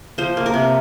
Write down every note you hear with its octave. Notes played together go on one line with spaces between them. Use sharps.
F3 C5
A#3
A#4
C3